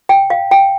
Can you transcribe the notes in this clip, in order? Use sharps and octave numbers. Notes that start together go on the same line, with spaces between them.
G5
F5
G5